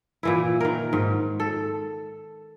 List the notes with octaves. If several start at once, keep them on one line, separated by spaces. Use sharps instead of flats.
A#2 E3 E4
D#3 A#4
G#2
A4